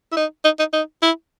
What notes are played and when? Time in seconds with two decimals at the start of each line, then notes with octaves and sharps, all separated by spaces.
0.12 E4
0.17 D#4
0.45 D#4
0.59 D#4
0.73 D#4
1.02 E4